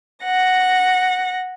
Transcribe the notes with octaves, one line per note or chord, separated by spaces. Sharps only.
F#5 A#6